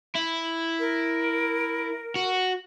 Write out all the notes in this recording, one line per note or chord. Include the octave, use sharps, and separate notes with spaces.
E4
A#4
F#4